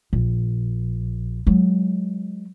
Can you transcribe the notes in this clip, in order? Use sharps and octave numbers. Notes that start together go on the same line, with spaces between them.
A#1
F#3 G#3